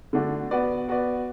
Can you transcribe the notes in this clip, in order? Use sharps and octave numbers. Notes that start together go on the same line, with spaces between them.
D3 A3 D4 F#4
B3 F#4 B4 D5
B3 F#4 B4 D5